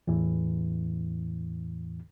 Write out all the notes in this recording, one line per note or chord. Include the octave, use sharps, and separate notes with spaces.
E2 A2 E3